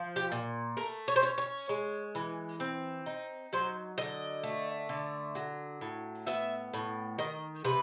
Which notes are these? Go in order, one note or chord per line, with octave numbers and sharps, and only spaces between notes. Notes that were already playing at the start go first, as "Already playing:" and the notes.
Already playing: F3
G4
A#2
A3 A#4
C#5
C5
C#4 C#5
C#5
G#3
E3
C4
D#4
F#3 C5
D3 D#5
A3
D3
F#3
A2
B3 E5
A2
D#3 D#5
C3 B4